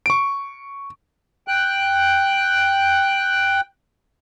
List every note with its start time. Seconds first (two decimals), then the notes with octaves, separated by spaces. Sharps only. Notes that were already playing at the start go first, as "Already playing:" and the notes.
0.06 C#6 D7
1.48 G5 F#6